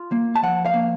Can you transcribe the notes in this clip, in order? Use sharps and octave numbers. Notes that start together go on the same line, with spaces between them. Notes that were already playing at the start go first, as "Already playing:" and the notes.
Already playing: F4
A#3
A5
F3 F#5
F5
A#3